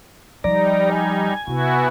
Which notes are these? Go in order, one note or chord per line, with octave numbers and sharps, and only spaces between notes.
F3 G3 D#4 D5 A#5
G#5
C3 B3 E4 F#4